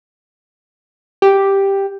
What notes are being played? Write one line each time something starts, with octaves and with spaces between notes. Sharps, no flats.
G4